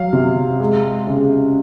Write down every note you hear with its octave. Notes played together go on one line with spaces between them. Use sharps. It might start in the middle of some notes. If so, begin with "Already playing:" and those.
Already playing: F#3 F5
C3
G#3
C#3